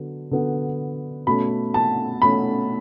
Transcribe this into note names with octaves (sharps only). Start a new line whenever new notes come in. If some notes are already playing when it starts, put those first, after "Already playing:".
Already playing: D3 F#3 B3
D3 F#3 B3
B2 A3 C#4 B5
A5
B2 A3 C#4 B5